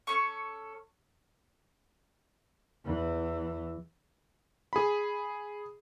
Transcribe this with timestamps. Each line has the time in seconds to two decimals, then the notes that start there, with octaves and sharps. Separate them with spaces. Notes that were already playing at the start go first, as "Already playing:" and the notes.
0.07 C#4 A4 C#6
2.86 E2 E3
4.73 G#4 B5